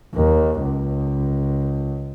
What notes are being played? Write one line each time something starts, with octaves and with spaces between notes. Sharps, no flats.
D#2
C#2